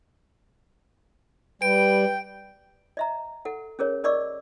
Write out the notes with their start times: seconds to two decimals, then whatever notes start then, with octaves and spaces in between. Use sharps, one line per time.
1.62 G3 B4 G5 D7
2.97 D#5 E5 A#5
3.45 A4 F#5
3.79 C#4 G#4 A#4 C#5
4.04 A#4 D5 D#5 C#6 D6 E6